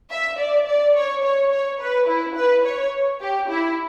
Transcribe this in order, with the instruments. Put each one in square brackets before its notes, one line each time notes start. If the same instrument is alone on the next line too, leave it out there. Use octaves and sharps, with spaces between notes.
[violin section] E5
D5
D5
C#5
C#5
C#5
B4
E4
B4
C#5
G4
E4